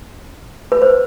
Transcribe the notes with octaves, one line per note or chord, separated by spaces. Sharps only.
B4
C5